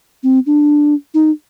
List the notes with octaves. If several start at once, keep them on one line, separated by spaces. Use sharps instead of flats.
C4
D4
D#4